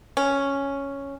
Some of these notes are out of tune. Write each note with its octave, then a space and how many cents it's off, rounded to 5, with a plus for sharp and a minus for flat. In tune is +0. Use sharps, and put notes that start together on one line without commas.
C#4 +0